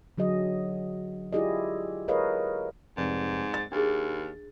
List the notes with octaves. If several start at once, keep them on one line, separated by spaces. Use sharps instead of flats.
D3 F#3 G#4 D#5
E4 F4 G4 G#4 D5 D#5
G#4 A#4 B4 C#5 D#5 F5
F1 G#2
A6
D#2 D4 G#4